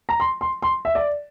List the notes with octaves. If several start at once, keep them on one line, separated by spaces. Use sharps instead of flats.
A#5
C6
C6
C6
E5
D5